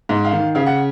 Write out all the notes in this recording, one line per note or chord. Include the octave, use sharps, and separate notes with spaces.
G#2
F5
D#3
C#3 F5
F#5